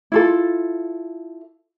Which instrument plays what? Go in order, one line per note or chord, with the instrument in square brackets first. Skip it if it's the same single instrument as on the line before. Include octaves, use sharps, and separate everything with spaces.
[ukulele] E4 F4 A4